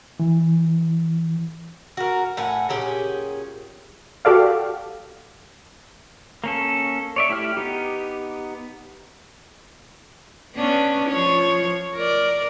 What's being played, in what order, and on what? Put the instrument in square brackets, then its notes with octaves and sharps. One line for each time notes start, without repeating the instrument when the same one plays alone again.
[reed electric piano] E3
[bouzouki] F#4 A#4
A2 F#5 G#5
A#2 C#4 G4 G#4
[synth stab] F#4 G4 A4 D5 F5
[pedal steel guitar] A#3 C#4 A4
C#5 D5 E5
A3 E4 G4 F6
B3 D#4 G4
[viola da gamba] B3 C#4 D4
F3 C#5
A#4 D5